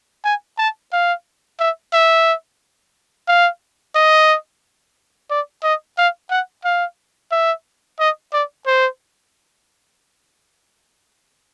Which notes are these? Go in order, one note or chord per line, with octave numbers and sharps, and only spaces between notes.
G#5
A5
F5
E5
E5
F5
D#5
D5
D#5
F5
F#5
F5
E5
D#5
D5
C5